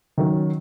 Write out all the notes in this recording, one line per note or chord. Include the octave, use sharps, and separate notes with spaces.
D#3 F#3 C#4